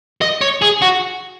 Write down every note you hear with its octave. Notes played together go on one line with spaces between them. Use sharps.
D#5
C#5
G#4
F#4